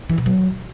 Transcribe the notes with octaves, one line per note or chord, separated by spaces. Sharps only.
E3
B2
F#3